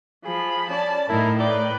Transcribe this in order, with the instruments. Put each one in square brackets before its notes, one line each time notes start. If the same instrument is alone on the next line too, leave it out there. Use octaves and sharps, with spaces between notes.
[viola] F3 B5 [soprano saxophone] G#4
[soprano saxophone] C#4 [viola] D5 A5
[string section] A2 [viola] D#4 A#4 [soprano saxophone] E4
[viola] B4 G5 [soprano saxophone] D5